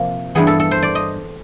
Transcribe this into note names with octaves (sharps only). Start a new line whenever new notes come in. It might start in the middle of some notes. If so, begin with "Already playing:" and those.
Already playing: C3 F3 A#3
G2 E3 G3 B3 G#4
A4
A4
C5
D5
D#5